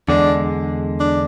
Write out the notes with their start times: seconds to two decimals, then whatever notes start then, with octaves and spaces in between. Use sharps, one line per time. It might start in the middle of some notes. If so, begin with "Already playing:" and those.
0.08 E2 D3 G#3 D4
1.00 D4